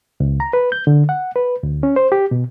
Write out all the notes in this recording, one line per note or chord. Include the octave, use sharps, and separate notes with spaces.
C#2
A#5
B4
G6
D3
F#5
B4
D2
C#4
C5
G4
B2